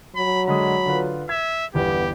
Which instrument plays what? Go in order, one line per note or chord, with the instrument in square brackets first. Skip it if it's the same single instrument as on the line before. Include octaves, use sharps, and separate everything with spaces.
[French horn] F#3 [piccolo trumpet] B5
[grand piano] D3 G#3 D#6 [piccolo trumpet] B5
[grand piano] D3 F4 B4
[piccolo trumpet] E5 [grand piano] G#6
[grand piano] G1 E2 G3 [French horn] B3 [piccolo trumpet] G4